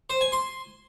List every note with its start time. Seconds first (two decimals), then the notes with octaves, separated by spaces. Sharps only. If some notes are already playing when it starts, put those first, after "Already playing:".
0.10 C5
0.21 G#5
0.32 C6